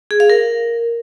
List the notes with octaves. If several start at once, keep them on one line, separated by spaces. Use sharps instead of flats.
G#4
F5
A#4